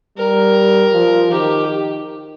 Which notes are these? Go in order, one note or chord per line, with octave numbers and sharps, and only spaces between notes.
G3 A#4
F3
D#3 G4